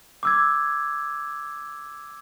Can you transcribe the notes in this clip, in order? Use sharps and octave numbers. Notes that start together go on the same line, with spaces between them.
D6 E6 G#6